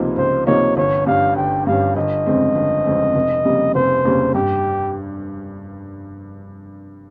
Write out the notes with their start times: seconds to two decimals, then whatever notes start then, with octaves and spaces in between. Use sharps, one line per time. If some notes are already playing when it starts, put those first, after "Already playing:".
Already playing: C#2 C3 F3 A#3 D#4
0.17 C#2 C5
0.47 C3 F3 A#3 D#4 C#5
0.77 G1 C#5
1.06 G2 G3 C#4 F5
1.36 G1 G5
1.67 G2 G3 C#4 F5
1.96 G1 D#5
2.26 F2 C#3 G#3 C4
2.56 G1
2.86 F2 C#3 G#3 C4
3.15 F1
3.45 F2 C#3 G3 A#3
3.75 F1 C5
4.05 F2 C#3 G3 A#3
4.34 G2 G4